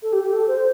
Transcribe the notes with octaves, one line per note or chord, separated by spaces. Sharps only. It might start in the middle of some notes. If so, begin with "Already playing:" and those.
A4
G4
G4
A4
C5